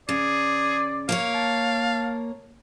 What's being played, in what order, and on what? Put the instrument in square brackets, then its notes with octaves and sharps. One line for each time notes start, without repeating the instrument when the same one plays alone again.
[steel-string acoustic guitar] C#3 [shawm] G#4 [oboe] D5
[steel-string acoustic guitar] A#3 A#4 C#5 [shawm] F5
[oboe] A5